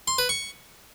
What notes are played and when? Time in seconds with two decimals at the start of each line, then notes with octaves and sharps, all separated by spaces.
0.08 C6
0.18 B4
0.29 C#6